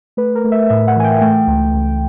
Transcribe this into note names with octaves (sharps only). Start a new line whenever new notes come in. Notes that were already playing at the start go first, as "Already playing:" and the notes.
A3 B4
A#4
A3
E5
A2 E5
F#5
E3 G#5
G5
A3 G5
C#2
C#2